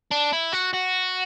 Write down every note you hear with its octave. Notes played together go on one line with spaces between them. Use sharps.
D4
E4
F#4
F#4